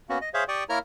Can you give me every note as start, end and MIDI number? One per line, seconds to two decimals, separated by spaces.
0.09 0.18 58
0.09 0.18 59
0.09 0.18 61
0.09 0.18 66
0.21 0.29 75
0.34 0.44 68
0.34 0.44 72
0.34 0.44 73
0.34 0.44 76
0.34 0.44 77
0.48 0.64 67
0.48 0.64 74
0.48 0.64 79
0.48 0.64 85
0.48 0.64 87
0.69 0.79 58
0.69 0.79 64
0.69 0.79 70
0.69 0.79 73
0.69 0.79 82
0.69 0.79 89